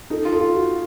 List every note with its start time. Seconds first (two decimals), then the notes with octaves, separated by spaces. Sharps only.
0.10 D#4 A4
0.25 F4
0.33 A4
0.41 F4
0.55 F#4